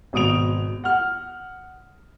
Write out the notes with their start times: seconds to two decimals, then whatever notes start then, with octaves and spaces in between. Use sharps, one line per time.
0.13 G#1 B2 D#6 D7 F7
0.84 F#5 F6